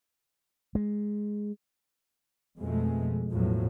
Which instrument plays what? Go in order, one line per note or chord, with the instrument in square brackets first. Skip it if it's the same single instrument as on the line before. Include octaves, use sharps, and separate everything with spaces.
[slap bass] G#3
[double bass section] F2 B2 G#3 A3
E2 A2 F3 F#3